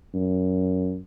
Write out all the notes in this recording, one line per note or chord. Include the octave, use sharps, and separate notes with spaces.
F#2